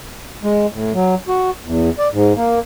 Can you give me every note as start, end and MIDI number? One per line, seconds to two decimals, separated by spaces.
0.43 0.67 56
0.73 0.92 45
0.94 1.15 54
1.28 1.50 66
1.65 1.90 40
1.98 2.08 74
2.13 2.33 44
2.36 2.59 58